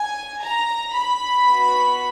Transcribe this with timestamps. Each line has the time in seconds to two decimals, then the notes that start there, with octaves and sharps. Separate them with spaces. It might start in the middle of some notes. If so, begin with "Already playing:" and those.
Already playing: G#5
0.43 A#5
0.94 B5
1.45 B3
1.51 F#4